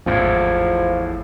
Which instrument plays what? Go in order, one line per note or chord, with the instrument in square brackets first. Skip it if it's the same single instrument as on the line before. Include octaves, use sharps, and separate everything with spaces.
[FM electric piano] G#1 [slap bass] E2 A2 [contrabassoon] F3